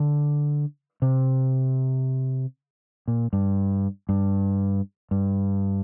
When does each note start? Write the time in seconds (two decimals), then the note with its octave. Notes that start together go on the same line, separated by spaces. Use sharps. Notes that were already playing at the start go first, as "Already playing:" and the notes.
Already playing: D3
1.02 C3
3.08 A#2
3.33 G2
4.09 G2
5.11 G2